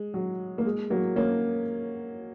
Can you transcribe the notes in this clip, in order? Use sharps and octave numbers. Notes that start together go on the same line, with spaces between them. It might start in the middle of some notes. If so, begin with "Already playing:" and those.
Already playing: G#3
F#3
A#3
G#3
F#3 A#3
A#3 C#4